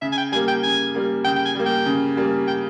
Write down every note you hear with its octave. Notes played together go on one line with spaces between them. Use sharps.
C#3 E5
G#5
G5
G3 A#3 G#5
G5
C#3 G#5
G3 A#3
C#3 G5
G5
G#5
G3 A#3
G5
C#3
G3 A#3
G5